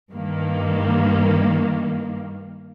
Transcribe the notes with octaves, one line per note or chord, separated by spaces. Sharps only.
G2 D#3 A#3